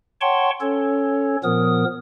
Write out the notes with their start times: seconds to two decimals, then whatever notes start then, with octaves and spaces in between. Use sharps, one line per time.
0.21 C#5 F#5 G5 A5 C6 C#6
0.61 C#4 A4 C#5
1.44 A#2 F3 B3 A#4 D#6